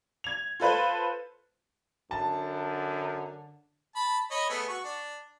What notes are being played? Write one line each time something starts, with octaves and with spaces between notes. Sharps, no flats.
G#6 F7
F4 A4 B4 C5
F#2 D3 A5
A5 B5
C#5 D#5 B5
A3 B3 G#4
F#4 C#6
D4